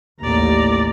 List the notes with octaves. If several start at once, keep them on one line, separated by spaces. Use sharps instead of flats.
A1 D#2 D5 A#5